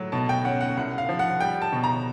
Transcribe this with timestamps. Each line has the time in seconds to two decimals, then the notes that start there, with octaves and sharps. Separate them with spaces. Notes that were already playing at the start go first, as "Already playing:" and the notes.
Already playing: A2 F#3
0.12 B2 A5
0.29 G5
0.45 C#4 F#5
0.61 F#5
0.77 C2 F#5
0.98 F5
1.09 F3
1.19 F#5
1.40 G3 G5
1.62 A5
1.73 B2
1.84 A#5